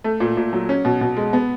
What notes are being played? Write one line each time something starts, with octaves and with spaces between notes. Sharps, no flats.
A3
A#2
A#2
F#3
C#4
B2
B2
G#3
B3